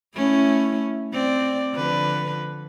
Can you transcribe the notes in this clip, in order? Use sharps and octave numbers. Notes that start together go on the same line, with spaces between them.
A3 C#4 E4
C4 D5
D3 F3 B4